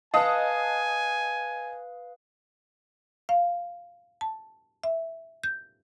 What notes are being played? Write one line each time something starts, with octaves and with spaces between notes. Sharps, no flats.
B4 D#5 F5 G#5 A5 D#6
F5
A5
E5
G6